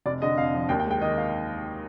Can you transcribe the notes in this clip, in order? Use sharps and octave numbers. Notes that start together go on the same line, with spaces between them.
F1 D5
D3 D#5
F2 F5
F3
D#2 G5
G5
G#3
G5
D#3 D#5
F5